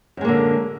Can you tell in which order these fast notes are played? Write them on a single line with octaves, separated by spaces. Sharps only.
F#2 G#3 A#3 D3